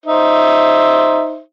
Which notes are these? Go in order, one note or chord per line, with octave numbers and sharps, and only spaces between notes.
D#4 C5 E5